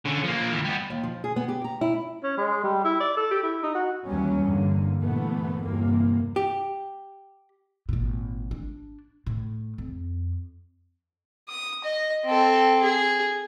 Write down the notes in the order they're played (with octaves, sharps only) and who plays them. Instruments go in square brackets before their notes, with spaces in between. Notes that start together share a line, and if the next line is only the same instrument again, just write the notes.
[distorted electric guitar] D3 C#4
F3 A#3
D2 E3
G3 B3
[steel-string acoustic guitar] D#2
F3
G#4
B3
G4
A#5
E4
[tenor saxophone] C#4
G#3
G3
E4
D5
A4
G4
E4
D#4
F#4
[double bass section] D#2 E3 F#3 G3 B3 C#4
E2 G2 D3 A#3
G2 A#2 E3 A3 B3
G1 E2 C3 E3 A#3
[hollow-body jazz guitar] G4
[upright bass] G#1 A#2
D4
A2
F2
[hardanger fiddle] D#6
D#5
C4 A4
G#4